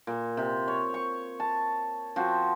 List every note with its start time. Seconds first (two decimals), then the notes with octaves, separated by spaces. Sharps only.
0.07 A#2
0.37 C3
0.68 C#5
0.94 C#6
1.40 A5
2.16 F3 C4 F#4